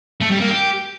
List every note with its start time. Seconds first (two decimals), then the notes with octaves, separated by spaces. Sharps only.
0.21 A3
0.31 G3
0.41 A#3
0.51 G4